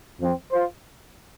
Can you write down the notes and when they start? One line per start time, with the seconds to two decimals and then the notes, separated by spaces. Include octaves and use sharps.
0.19 F2 F3 C4
0.52 F4 C5